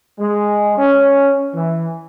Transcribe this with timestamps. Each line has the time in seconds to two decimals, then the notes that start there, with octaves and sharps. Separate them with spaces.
0.20 G#3
0.78 C#4
1.55 E3